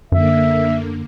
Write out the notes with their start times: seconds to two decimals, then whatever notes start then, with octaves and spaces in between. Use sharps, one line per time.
0.12 F#2 D3 A#3 E5